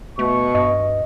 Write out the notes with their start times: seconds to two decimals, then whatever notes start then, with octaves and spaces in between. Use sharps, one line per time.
0.19 B2 A3 C#6
0.55 G2 D#5